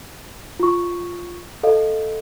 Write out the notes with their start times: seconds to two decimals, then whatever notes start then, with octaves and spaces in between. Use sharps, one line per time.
0.59 F4 C#6
1.63 A4 D#5 F5